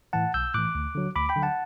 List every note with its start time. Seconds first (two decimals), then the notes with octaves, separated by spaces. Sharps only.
0.13 A2 E3 F#5 A5
0.34 B1 E6 G6
0.54 A2 E3 D6 F#6
0.75 D2
0.95 D3 F#3
1.16 D2 B5 D6
1.29 G5 B5
1.36 D3 F#3
1.43 F#5 A5